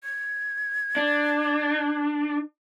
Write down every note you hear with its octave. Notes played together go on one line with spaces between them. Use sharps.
G#6
D4